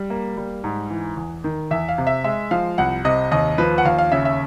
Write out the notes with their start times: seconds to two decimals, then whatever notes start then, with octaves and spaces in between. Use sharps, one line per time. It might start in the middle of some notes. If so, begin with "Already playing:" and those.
Already playing: G3
0.10 A#3
0.37 G3
0.64 G#2
0.90 E3
1.17 E2
1.44 D#3
1.71 E2 E5
1.89 F5
1.98 C3
2.07 E5
2.24 G#3 E5
2.51 F3 F5
2.78 C2 F#5
3.05 C3 D#5
3.31 D#2 D#5
3.58 F3 B4
3.78 F#5
3.85 D#2 F5
3.98 F5
4.12 C#3 E5
4.25 E5